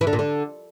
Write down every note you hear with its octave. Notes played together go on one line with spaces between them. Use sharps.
E3
D3
A#2
D3